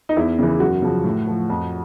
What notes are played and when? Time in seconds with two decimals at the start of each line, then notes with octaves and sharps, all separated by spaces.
0.09 D#4
0.17 E2 E4
0.39 C#3 E3
0.60 F#2 F#4
0.82 C#3 F3
1.04 A2
1.27 F3
1.50 F2